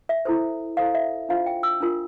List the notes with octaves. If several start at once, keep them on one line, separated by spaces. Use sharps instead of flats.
E5
E4 A4 C5
E4 A4 C5 F5
E5
D4 F4 C5 F5
G5
E6
D4 F4 A#4